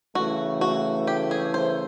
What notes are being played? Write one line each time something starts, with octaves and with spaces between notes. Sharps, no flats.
C#3 E3 A3 F#4
F#4
G4
G#4
C5